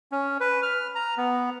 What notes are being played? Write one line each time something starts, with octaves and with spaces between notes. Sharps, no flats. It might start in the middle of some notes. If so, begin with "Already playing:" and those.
C#4
B4
F6
A#5
B3